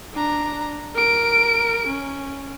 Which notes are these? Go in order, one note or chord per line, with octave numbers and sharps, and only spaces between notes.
D4 A#5
A#4 D7
C#4